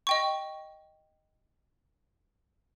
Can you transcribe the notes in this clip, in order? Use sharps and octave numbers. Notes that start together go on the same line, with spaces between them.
D#5 G5 C#6